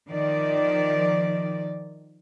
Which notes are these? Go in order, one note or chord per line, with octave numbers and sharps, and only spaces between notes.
D#3 F3 D5